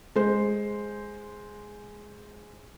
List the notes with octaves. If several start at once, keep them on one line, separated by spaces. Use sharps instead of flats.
G#3 C5